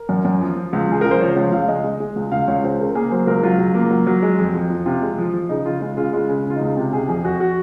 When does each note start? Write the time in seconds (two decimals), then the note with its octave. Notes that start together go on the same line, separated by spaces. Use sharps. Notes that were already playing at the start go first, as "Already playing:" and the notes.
Already playing: A#4
0.09 F#2
0.25 F#2
0.41 F3
0.56 F3
0.73 C#2
0.89 F3 G#4
1.01 C#2 A#4
1.11 C5
1.20 F3 C#5
1.36 C#2 C#5
1.52 C#2 F5
1.68 G#3 D#5
1.84 G#3
2.00 G#3
2.16 C#2
2.31 C#2 F5
2.48 C#2 C#5
2.64 C#2 C5
2.79 C#3 A#4
2.95 A#3 G#4
3.11 F#3 C5
3.27 C#2 A#4
3.43 F#3 F4
3.59 C#2
3.75 A#3
3.91 F#3
4.07 F#3
4.22 G#3
4.39 F2
4.54 F2
4.70 F3
4.86 C3 F4
5.02 G#3
5.18 F3
5.34 F3
5.49 C#3 D#4
5.65 C#3 F4
5.81 G#3 F4
5.97 C#3 F4
6.13 G#3 F4
6.29 C#3
6.45 C#3 F4
6.56 D#4
6.61 C#2
6.77 C3 F4
6.93 C3 G#4
7.09 F2 G#4
7.24 F2 F#4
7.40 F#4